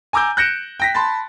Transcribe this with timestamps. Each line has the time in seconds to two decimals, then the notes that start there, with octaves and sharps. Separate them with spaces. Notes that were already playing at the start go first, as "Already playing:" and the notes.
0.13 G#5 A#5 D6 E6 G6
0.37 F#6 G6 A#6 C#7 D7 E7
0.80 G5 A#6 B6
0.94 A5 B5 C6 A6